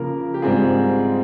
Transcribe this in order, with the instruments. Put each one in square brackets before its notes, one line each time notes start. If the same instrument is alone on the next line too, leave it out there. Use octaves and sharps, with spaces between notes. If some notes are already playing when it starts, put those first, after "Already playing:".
Already playing: [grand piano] C#3 F3 A#3 A#4
G4
G#2 G3 C4 F4 G#4